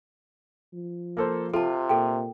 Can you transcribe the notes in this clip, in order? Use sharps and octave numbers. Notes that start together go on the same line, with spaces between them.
F3
A#3 A4 C5
C3 F4 A4 A5
A#2 A4 G5